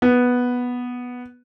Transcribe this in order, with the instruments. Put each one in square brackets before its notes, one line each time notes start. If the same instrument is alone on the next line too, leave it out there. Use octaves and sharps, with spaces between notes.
[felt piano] B3